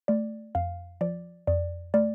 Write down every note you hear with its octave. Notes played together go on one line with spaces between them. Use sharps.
A3 D5
F2 F5
F3 D5
F2 D5
A3 D5